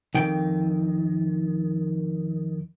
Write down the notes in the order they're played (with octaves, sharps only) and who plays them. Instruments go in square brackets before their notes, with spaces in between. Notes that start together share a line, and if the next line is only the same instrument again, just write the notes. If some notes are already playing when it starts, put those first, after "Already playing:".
[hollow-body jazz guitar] F2 G5 [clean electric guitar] D#3